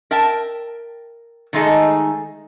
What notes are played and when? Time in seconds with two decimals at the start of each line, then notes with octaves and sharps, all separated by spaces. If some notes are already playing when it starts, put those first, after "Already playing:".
0.11 A#4 E5 G5 A5
1.53 D#3 G#3 A3 D#4 G#4 A4